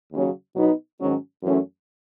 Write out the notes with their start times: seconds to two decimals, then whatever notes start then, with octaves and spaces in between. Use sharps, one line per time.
0.12 D#2 C#3 F#3 C#4
0.55 B2 F#3 B3 D#4
0.99 G#2 D#3 F#3 C#4
1.42 F#2 E3 A3 C#4